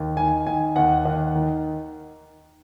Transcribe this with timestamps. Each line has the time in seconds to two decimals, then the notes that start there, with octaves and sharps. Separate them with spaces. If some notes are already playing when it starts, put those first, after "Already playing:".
Already playing: D#2
0.17 D#3 G#5
0.46 D#3 G#5
0.76 D#2 F#5
1.05 D#2
1.35 D#3